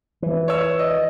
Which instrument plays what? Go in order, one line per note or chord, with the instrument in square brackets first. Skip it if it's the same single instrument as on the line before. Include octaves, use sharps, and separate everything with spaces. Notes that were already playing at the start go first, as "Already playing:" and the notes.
[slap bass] E3
[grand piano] C#5 E6
D#5